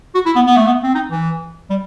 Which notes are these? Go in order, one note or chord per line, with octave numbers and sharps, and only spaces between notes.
F#4
E4
B3
B3
A3
B3
C4
D#4
E3
G3